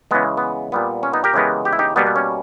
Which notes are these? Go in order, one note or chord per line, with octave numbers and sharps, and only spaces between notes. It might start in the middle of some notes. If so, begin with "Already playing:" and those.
C#3 E3 G#3 B3
B3
A#2 G3 B3
C#4
B3 D#4
G4 A#4
C#3 E3 G#3 B3
G4
E4
D#4 G4
B2 G3 A#3 B3
B3
C#4